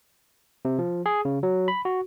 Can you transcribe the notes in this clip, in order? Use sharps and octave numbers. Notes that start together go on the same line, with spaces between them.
C3
F3
G#4
C#3
F#3
B5
F#4